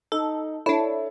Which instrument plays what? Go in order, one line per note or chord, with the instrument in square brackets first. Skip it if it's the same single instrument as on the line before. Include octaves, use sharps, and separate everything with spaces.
[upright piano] D#4 [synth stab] A4
[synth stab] D4 E4 [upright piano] A4 C#5 E5